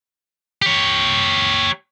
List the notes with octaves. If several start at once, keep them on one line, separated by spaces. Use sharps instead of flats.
G4 C#5